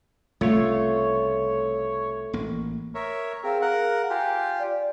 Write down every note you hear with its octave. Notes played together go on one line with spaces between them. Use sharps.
C2 C#3 A3 F4 C#5
A1 A#3
A#4 C#5 E5
C4 G#4 A#4 F5
A#4 F#5
F4 G4 G#5
D5